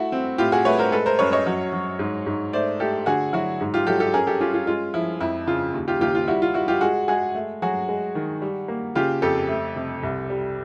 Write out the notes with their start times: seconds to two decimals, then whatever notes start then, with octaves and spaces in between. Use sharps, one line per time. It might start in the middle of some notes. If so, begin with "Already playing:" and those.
Already playing: A3 E4 F#4
0.12 C4
0.38 A2 F4 G4
0.52 F#4 G#4
0.65 A3 B4 C#5
0.79 A#4 C5
0.92 G#3 A4 B4
1.06 A#4 C5
1.19 F#2 B4 C#5
1.32 C#5 D#5
1.46 F#3
1.73 F#3
1.99 G#2
2.26 G#2
2.53 A3 C5 D5
2.79 A3 G4 A4
3.06 D3 F#4 G#4
3.33 F#3 E4 F#4
3.61 G#2
3.74 F4 G4
3.87 F#3 G4 A4
4.00 G4 A4
4.14 C#4 G#4 A#4
4.27 G4 A4
4.41 C#4 F4 G4
4.54 F4
4.67 G#3 F4
4.94 F3 E4
5.21 F2 E4
5.47 C#3 F4
5.74 D#2
5.88 F4 G4
6.01 D#2 F4 G4
6.15 F4
6.28 G3 E4 F#4
6.42 F4
6.54 G3 E4 F#4
6.68 F4 G4
6.81 G#3 F#4 G#4
7.08 G#3 F#4 G#4
7.35 A3
7.62 F#3 F#4 G#4
7.89 G#3
8.15 D#3
8.42 G3
8.68 A#3
8.95 C#3 F4 G4
9.22 F2 G4 A4
9.49 A3
9.76 C3
10.03 C2
10.30 G3